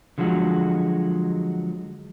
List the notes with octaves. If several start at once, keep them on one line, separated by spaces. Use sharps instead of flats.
D3 F3 F#3 G#3 F#4